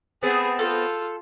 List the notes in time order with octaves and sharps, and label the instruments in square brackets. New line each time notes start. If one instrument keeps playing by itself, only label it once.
[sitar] A3 B3 C4 [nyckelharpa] G#4
[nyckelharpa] F4 [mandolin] A4 G6